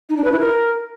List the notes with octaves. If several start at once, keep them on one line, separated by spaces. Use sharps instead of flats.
D#4
D4
B4
E4
A#4